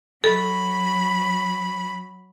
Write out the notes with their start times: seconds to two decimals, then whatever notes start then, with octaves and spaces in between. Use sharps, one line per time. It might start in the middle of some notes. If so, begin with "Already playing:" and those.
0.24 F#3 A4 B5